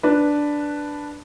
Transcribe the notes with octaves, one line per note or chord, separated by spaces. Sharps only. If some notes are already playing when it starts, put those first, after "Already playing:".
D4 B4